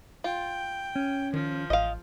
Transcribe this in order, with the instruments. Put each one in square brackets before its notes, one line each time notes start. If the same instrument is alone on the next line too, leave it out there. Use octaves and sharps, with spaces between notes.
[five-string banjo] F4 [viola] G5
[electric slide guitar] C#4
[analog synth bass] D#3 [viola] F3
[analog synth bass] A1 [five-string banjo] D#5 F5